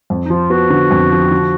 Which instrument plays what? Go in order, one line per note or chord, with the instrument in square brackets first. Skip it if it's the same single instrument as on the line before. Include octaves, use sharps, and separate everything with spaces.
[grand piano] F2
[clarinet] D#4
[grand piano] F3 [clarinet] F4
[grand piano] B3 [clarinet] F#4
[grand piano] D3
F2
F3
D3